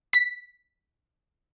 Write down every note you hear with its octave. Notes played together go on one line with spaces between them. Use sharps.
B6